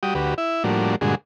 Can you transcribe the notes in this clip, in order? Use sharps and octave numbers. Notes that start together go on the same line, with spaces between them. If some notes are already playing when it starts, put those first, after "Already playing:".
G3 F#4 G5 D#6
D2 F#4 G4 B4
E4 E5
A2 F3 G3 A#3 D4 F#4
G2 A#2 D3 G#3 F#4 G#4